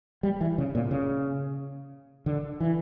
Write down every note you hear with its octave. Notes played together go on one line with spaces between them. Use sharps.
G3
E3
C#3
A#2
C#3
D3
E3